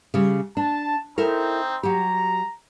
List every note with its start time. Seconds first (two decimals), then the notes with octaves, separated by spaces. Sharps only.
0.14 C#3 G3
0.57 D4 A5
1.18 C4 D#4 E4 A4 A#4
1.83 F#3 G4 A#5